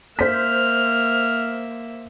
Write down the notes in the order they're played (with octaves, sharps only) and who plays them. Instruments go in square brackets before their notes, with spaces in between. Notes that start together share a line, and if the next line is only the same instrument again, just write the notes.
[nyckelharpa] A#3 E5 [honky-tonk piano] C5 B6 [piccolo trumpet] F6